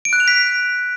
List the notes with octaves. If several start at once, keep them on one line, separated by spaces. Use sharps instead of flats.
D7
F#6
F7
B6